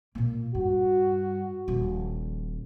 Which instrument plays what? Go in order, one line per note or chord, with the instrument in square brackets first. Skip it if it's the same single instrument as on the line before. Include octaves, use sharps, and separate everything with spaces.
[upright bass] A#2 A#3
[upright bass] G2 [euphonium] F#4
[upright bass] D#1 F3